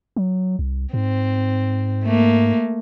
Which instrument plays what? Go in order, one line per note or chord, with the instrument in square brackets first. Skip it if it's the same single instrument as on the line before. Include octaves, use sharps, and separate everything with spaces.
[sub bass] F#3
C2
[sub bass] G#2 [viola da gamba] C4
[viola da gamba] A3 A#3